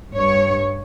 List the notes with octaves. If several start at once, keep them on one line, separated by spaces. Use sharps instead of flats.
G2 C#5